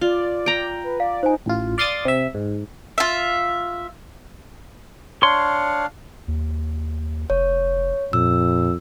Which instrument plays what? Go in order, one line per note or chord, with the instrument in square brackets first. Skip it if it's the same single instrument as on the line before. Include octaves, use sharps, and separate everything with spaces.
[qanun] F4 [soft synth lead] D5
[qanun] G5 A#5
[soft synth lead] B4
[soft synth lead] D5 [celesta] F5
[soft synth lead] D#4 [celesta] C5 G#5
[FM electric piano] A1 F4
D5 F5 C6 D6 D#6 A6
C3 E5
G#2
[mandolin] F4 E5
[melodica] D4 F5 [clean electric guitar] C#5 C6
[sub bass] D#2
[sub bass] F1 [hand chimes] C#5
[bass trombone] F2 [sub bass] A#2 [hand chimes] E6